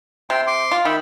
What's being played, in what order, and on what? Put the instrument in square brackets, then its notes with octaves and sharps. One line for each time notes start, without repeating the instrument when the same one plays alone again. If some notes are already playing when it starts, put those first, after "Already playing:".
[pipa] C3 [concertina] G5 C6
[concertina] C6 D6
[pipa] F4
[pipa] D#3 [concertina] E5 B5